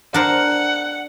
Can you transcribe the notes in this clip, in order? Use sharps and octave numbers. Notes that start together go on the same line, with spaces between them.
D4 A#4 C5 F#5